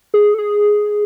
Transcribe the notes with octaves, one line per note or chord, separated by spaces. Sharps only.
G#4
A4
G#4